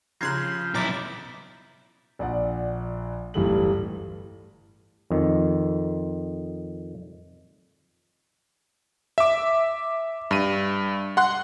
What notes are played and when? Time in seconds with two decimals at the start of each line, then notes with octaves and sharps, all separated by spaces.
0.21 C#3 F3 G4 A#5 C6 F#6 G#6 C7
0.75 B1 E4 A#5 D6 A6
2.19 A#1 D5 F#5
3.34 D1 G1 E3 G3 A3 F#7
5.10 F2 D#3
9.18 E5 D6
10.31 G2 D#7
11.17 F#5 C6 F#6